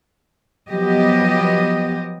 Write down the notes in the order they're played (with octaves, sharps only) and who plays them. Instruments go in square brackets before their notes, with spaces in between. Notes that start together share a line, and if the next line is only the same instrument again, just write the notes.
[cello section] F3 F#3 B3 G4 D#5